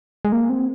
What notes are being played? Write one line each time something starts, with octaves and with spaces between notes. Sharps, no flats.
G#3
A#3
C4